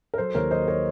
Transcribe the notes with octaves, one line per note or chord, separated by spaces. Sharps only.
A#4
F#3 A4 C5
D#2 A#4 C#5
F#3 C5 D#5
A#4 C#5